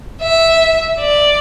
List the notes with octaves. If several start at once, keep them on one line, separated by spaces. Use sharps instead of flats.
E5
D5